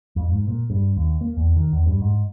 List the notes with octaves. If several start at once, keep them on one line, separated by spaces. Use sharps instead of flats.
F2
G#2
A#2
G2
D#2
A#3
E2
D#3
E2
G2
G#2